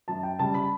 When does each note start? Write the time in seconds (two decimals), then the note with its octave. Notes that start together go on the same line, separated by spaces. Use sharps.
0.08 F#2 A5
0.23 G5
0.39 C#3 G3 A5
0.54 B5